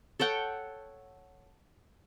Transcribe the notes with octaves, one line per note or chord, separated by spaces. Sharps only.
A4 C#5 F#5 G5